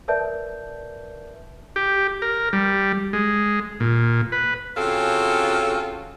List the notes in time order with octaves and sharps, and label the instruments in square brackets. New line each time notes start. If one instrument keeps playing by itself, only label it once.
[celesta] A#4 B4 D5 E5 A5 G6
[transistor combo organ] G4
A#4
G3
G#3
A#2
B4
[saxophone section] C#3 C4 C#4 F4 F#4 A4